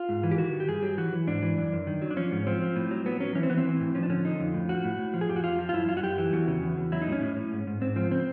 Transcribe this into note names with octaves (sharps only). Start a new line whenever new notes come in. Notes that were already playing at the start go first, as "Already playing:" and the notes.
Already playing: F4
G#2
E3
G4
D#3 F#4
D#3
G4
G2 G#4
F#3 G4
E3 F#4
E3
G#2 D4
E3
F#2
F#2
D#3
F#3
D4
F3 C#4
G#2
F3 C4
F3
A2
F#3
F#3 B3
F#3 C#4
E3 C#4
C4
E3 B3
C4
E3
A2
F3 C#4
D4
D3 C#4
D3 D#4
F2
A2
F3 F#4
A2
A2
F3
G#4
F2 G4
F#4
F2 F4
F3
F4
F#2 E4
F#2 F4
F#4
F#2 G4
E3
E2 F#4
C#3
E2
E2
F#3 E4
D#4
A2
C#4
A2
A2
G#2
G#2
G#2 C4
F3 C4
C#3 C4